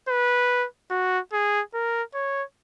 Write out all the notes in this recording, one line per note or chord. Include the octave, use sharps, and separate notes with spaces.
B4
F#4
G#4
A#4
C#5